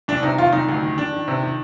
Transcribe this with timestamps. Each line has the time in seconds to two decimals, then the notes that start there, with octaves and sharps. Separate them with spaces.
0.08 C2 D4
0.23 C3 D#4
0.38 D#3 F4
0.52 C2 D#4
0.69 D2
0.83 D#3
0.97 D#3 D4
1.12 D#3
1.28 C3
1.42 D#3